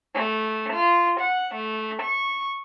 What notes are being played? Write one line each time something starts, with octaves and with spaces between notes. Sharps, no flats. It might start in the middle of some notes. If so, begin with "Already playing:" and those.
A3
F4
F#5
A3
C#6